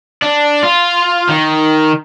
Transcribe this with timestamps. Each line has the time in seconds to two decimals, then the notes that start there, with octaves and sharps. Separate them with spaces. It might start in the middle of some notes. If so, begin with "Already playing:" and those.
0.22 D4
0.63 F4
1.29 D#3